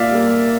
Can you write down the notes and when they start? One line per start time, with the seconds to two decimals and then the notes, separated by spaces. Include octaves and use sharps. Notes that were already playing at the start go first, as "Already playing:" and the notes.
Already playing: A#2 A#3 D5 E5 F5
0.11 G3 A#3